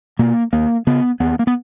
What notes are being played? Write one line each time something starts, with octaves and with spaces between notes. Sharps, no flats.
B2 A#3
D#2 A#3
C#3 B3
D#2 B3
A#3
B3